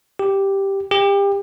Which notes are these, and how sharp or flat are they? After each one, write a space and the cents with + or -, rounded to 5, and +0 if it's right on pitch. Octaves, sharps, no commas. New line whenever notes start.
G4 +0
G4 +30